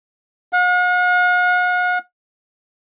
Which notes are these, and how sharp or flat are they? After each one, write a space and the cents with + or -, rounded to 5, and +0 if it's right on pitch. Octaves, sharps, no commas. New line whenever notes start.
F#5 -45